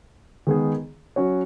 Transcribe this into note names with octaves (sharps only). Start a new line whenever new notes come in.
D#3 G#3 B3 D#4 G#4
F#3 C#4 F#4 C#5